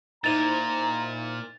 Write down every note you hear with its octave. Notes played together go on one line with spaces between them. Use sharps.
A#2 D#4 E4 C5 A#5 A6 F7